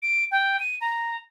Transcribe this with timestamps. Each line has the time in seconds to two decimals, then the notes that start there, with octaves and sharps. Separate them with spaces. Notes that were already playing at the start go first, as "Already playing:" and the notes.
0.02 D7
0.31 G5
0.60 D#7
0.81 A#5